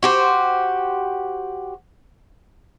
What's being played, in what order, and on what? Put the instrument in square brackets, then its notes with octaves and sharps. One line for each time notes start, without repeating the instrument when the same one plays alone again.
[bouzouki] F#4 G4 C5